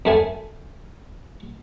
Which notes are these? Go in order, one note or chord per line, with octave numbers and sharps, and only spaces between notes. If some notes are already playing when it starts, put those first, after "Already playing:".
F#2 A3 G#5